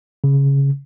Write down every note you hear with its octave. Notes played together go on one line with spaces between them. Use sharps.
C#3